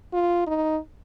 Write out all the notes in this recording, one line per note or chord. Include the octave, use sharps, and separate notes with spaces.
F4
D#4